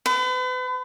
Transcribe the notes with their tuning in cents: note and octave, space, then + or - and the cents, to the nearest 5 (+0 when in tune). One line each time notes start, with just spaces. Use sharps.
B4 +40